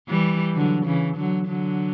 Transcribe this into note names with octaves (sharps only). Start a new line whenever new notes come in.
E3 G3
D3 F#3
C#3 E3
D3 F#3
D3 F#3